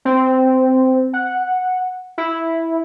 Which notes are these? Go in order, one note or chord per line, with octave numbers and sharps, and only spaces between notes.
C4
F#5
E4